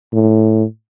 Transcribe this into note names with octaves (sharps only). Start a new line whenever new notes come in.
A2